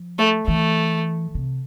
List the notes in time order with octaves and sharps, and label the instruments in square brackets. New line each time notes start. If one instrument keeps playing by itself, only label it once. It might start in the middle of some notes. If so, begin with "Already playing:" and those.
Already playing: [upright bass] F3
[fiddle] A3
[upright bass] E3 [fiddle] A3
[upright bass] C3